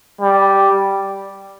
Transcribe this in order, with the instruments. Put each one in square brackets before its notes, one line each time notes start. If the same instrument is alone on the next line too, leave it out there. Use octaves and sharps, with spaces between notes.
[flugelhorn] G3